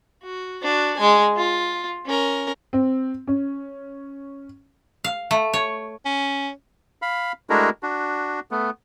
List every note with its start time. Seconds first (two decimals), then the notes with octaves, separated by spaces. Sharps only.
0.23 F#4
0.62 D4 F#4
0.97 G#3 G#5
1.36 F4
2.06 C#4 A#4
2.73 C4
3.27 C#4
5.04 F5
5.31 A3
5.53 C#5
6.05 C#4
7.02 F5 B5
7.50 G#3 A3 D4 E4 F#4 A#4
7.83 D4 F#4
8.51 A3 B3